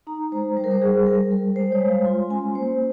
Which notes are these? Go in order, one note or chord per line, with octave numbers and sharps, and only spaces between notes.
D#4 A#5
G#3 C5
G3 C5
A#4
C5
G3 G#4
G3 A#4
G3 A#4
G#3 C5
C#5
G#3
F5
F4 C6
C#4 G#5
A#3 C5